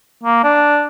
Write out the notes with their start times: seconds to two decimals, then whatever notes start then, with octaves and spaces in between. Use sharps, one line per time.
0.24 A#3
0.44 D4